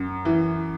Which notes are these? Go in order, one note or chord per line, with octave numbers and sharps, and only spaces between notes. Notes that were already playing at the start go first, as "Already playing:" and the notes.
Already playing: F#2
E3